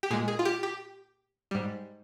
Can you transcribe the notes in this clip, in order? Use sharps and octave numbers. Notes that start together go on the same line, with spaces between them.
G4
A#2 G#3 G#4
G#4
F4
G4
G4
G#2 G3